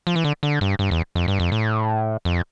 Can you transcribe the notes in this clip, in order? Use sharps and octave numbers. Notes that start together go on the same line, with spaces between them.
F3
E3
D3
D3
G2
G2
E2
F2
G2
F2
A2
F2